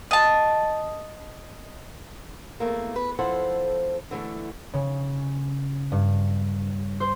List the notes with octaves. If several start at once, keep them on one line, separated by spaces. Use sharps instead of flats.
D#5 A5
E2 A3 A#3
B4
F2 F3 E4 A4 C5 F#5
D3 E3 F#3 A3
C#3
G2
C5